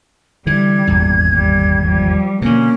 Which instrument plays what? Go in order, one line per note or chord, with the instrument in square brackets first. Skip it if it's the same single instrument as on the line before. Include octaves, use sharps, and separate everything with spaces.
[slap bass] D3 E3 [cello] G3 [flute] G#6
[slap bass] D#1 G#1 E2
[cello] G3
F3 G3
[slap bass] B2 D3 [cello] A#3 [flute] C#4